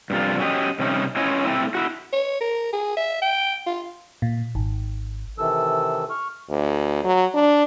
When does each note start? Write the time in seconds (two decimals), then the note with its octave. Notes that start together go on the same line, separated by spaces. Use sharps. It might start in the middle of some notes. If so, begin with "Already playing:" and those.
0.10 G2 C3 F4
0.39 F#3 C#4 G4 D#5
0.79 C3 G3 C#4 D#4
1.16 C#4 E4 F4 C#5 D#5
1.45 A3 C4 E4
1.75 E4 F#4
2.13 C#5
2.41 A#4
2.73 G#4
2.97 E5
3.22 G5
3.67 F4
4.22 A#2
4.55 G#1
5.38 C3 D#3 E3 A4 E6
6.10 C#6 F6
6.50 D2
7.04 F#3
7.34 D4